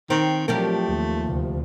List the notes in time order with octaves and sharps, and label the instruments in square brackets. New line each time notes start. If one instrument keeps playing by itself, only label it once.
[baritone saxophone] D#3 [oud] C4
[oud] F3 G4 A#4 [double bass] F#3 D4 [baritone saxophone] A3
[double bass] D#2
D2 C3